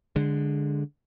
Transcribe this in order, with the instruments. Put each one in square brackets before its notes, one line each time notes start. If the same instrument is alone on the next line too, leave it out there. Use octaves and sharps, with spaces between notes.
[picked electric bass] D3 G#3